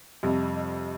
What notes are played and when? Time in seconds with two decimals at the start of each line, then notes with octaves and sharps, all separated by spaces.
0.23 F2 C3 G3 D#5